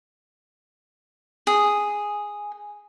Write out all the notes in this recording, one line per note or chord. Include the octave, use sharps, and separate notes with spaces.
G#4